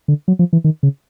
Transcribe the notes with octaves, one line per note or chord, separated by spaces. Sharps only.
D3
F#3
F3
E3
D#3
C#3